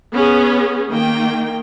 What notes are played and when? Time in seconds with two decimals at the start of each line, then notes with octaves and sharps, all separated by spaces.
0.13 B3 C#4 G#4
0.91 D#3 A#3 G5